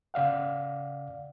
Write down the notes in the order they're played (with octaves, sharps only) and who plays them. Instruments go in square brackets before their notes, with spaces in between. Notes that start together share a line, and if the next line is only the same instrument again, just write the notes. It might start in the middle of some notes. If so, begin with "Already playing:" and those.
[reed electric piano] C#3 D5 F5 F#5